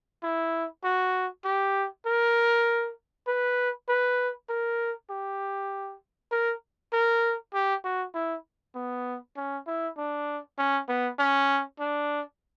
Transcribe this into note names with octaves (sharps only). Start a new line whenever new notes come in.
E4
F#4
G4
A#4
B4
B4
A#4
G4
A#4
A#4
G4
F#4
E4
B3
C#4
E4
D4
C#4
B3
C#4
D4